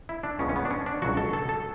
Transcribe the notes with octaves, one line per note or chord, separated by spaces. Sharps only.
E4
D4
C#2 C#3 G#3 B3 C#4
C#4
B3
D4
C#4
D4
C#2 B2 F#3 F#4
A4
A4
A4